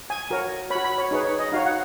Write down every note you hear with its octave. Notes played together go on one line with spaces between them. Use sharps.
G#5
F#4 A#4 C#5
F#4 C#5 B5
B5
C#5
D#4 G#4 B4 C#5
C#5
D#5
D#4 F#4 C#5 F5
F#5